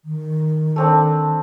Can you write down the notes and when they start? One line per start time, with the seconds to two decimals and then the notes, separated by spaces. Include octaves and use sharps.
0.05 D#3
0.76 A3 C4 D4